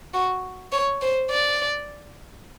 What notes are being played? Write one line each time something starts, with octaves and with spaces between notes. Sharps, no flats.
F#4
C#5
C5
D5